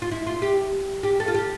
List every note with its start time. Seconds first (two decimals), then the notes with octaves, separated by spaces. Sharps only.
0.02 F4
0.11 E4
0.27 F4
0.42 G4
1.03 G4
1.20 A4
1.28 F4
1.35 G4